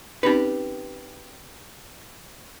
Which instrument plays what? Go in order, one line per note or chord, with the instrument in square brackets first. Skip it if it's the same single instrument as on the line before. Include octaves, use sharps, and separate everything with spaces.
[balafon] C4 C#4 D#4 [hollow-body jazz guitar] G4 B4